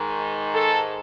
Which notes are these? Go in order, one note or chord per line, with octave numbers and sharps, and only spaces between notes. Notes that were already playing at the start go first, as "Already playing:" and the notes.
Already playing: G#2 D#3
A4